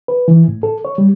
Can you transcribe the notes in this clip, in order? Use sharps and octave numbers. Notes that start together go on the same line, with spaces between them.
B4
E3
A2
A4
C#5
G3